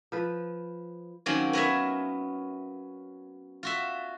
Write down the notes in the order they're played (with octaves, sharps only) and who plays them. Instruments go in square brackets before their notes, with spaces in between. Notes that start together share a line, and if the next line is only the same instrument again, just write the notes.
[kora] F3 B4
[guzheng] D#3 F#3 A#3 C4 C#4
B3 A#4 C#5 E5
F4 F#4 E5